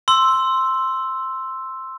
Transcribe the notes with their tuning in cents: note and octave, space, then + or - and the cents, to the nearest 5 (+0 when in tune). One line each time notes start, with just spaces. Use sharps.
C6 +0 E6 +0